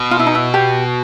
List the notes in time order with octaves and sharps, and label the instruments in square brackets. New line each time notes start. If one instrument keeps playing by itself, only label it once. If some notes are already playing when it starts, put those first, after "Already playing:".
Already playing: [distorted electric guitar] B2
[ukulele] F4
E4
D#4
E4
G4